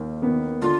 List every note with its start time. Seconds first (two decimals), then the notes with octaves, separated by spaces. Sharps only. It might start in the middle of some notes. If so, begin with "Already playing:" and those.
Already playing: D#2 D#3
0.22 D#3 B3
0.62 D3 F4